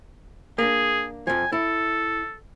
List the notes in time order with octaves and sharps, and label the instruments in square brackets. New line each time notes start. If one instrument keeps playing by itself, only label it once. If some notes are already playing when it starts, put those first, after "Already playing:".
[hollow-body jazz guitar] A#3 D4 [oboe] G#4
[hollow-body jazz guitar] F2 F3 [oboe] G#5
[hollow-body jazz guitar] E4 [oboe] A4